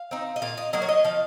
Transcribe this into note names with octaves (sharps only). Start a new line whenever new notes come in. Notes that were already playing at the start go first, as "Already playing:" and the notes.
Already playing: F5
C4 D#4
D#5
A#2 F5
D#5
F#3 A#3 D#5
C#5
D#5
F3 F5